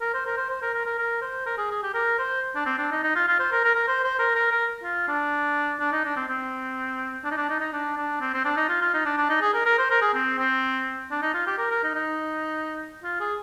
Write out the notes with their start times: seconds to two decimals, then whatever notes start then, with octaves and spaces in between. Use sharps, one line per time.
0.01 A#4
0.14 C5
0.26 A#4
0.37 C5
0.50 C5
0.62 A#4
0.74 A#4
0.86 A#4
0.98 A#4
1.22 C5
1.46 A#4
1.58 G#4
1.71 G#4
1.83 G4
1.94 A#4
2.19 C5
2.55 D4
2.66 C4
2.78 D4
2.92 D#4
3.03 D#4
3.16 F4
3.28 F4
3.39 C5
3.52 A#4
3.64 A#4
3.75 A#4
3.88 C5
4.04 C5
4.19 A#4
4.35 A#4
4.51 A#4
4.84 F4
5.08 D4
5.80 D4
5.92 D#4
6.05 D4
6.16 C4
6.28 C4
7.24 D4
7.31 D#4
7.37 D4
7.50 D#4
7.61 D#4
7.73 D4
7.97 D4
8.21 C4
8.34 C4
8.45 D4
8.57 D#4
8.69 F4
8.81 F4
8.94 D#4
9.05 D4
9.17 D4
9.30 D#4
9.41 G#4
9.54 A#4
9.66 A#4
9.79 C5
9.91 A#4
10.02 G#4
10.14 C4
10.38 C4
11.11 D4
11.22 D#4
11.34 F4
11.47 G4
11.58 A#4
11.71 A#4
11.84 D#4
11.95 D#4
13.04 F4
13.20 G#4